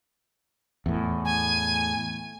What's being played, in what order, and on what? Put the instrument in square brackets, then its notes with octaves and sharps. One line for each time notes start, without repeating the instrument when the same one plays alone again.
[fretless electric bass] E2 A2
[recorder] G#5